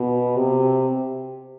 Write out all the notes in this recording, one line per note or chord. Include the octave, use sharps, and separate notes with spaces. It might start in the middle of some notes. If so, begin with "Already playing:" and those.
Already playing: B2
C3